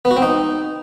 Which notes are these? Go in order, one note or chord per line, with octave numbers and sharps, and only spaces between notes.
B3
F#4
C4
D#4